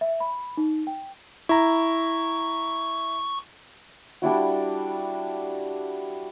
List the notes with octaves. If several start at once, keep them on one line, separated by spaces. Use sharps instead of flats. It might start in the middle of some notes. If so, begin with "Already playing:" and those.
E5
B5
D#4
G5
E4 A#5 C#6
G3 D4 E4 F#4